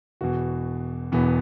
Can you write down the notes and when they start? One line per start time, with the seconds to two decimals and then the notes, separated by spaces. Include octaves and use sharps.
0.21 E1 E2 B2 F#4
1.12 E1 E2 B2 B3